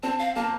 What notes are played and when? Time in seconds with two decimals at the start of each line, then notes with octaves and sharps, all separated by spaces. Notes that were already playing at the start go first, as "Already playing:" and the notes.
0.03 C4 A5
0.19 F5
0.35 A#3 A5